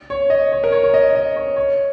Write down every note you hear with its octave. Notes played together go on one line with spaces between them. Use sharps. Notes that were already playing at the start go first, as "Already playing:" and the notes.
C#5
D#5
C#5
A#4
C#5
C#5
D#5
D#5
C#5
C#5